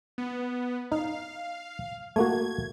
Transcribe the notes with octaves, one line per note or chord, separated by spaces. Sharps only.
B3
D#4 F5
A3 A#3 F#4 G#6